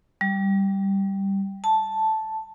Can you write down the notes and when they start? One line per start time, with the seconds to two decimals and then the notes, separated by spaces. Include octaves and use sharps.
0.21 G3
1.64 A5